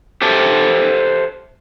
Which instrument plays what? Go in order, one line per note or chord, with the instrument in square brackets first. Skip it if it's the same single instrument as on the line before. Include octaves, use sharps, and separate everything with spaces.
[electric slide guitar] G4 A4 C5 E5 A5